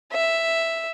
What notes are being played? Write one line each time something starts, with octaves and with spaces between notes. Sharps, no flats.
E5